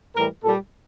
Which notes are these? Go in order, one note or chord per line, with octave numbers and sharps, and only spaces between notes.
A2 E3 G3 A#4
A#2 G3 A4